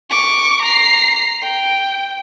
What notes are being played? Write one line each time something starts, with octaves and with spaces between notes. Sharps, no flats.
C#6 D6
A#5 C7
G5